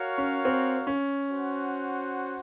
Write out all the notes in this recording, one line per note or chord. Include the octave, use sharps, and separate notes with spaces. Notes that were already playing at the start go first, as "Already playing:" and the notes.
Already playing: F#4 A#4 C#5 F5
C#4
C4
C#4
F#4 C5 F#5